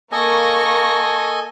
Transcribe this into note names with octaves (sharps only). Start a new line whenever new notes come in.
A#3 A4 D#5 G#5 C#6 A#6